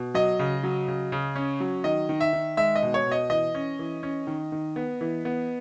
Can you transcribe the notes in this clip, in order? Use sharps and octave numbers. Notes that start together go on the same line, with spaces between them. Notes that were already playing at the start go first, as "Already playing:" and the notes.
Already playing: B2
F#3 D#5
C#3
F#3
C#3
C#3
C#4
F#3
D#3 D#5
D#3
E5
D#3
G#3 E5
D#5
B2
C#5
B2
D#5
E3 D#5
C#4
E3
C#4
D#3
D#3
B3
E3
B3